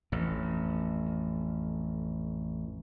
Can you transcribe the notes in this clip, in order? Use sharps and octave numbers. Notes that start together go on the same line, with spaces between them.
A1 F2